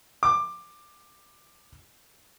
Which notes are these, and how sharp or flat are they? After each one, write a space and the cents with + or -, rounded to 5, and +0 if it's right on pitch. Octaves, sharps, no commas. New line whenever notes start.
D6 +15